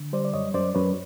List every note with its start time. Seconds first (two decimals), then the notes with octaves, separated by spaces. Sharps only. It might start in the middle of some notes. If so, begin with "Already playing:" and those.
Already playing: D3
0.13 G3 C5 D5
0.25 D5
0.34 F#2 C#5 D#5
0.54 F#2 C5 D5
0.75 F#2 B4 C#5